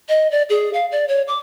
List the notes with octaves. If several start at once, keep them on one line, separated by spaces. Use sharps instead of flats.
D#5
D5
G#4
F5
D5
C#5
D6